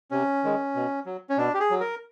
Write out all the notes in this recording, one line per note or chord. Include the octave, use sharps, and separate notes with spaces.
C3 C#4
D#3 G#3
B2
F#3
C#4
B2 D4
G4
G#4
F#3
A#4